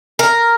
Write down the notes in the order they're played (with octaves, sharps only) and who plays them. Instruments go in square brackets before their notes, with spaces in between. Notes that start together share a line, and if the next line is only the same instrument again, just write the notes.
[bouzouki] A#4